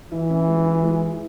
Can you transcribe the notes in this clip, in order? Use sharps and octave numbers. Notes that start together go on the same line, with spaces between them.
E3 E4
C#4
G#3
E4
G#3
E4